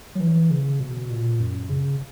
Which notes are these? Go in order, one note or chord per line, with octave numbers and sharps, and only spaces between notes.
F#3
E3
C#3
B2
A#2
F#2
C#3